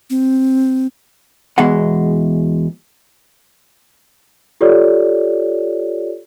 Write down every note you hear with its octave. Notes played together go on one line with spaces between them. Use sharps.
C4
E2 B2 G#3 F#5
F4 G4 A4 C#5 D5